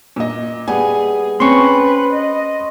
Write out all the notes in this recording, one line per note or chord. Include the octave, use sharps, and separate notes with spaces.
A#2 D#5
G3 B3 G#4 G#5
C4 C#4 B4 C6 C#6
D#5